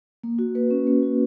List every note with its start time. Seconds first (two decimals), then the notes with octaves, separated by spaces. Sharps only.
0.24 A#3
0.39 F#4
0.55 A#3 B4
0.71 C#4
0.87 A#3
1.03 F#4